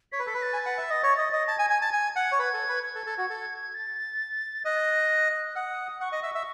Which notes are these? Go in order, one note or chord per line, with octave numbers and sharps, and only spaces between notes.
C#5 B6
B4
A4 B6
B4
A6
G#5 A6
F#5
E5
D#5
C#5
D#5
D#5
A5 G#6
G#5
G#5
A5
G#5
F#5
C#5
B4 G#6
A4
B4
G#6
A4
A4
F#4
A4
A6
D#5 F#6
F#5 D#6
F#5 C#6
D#5
E5
E5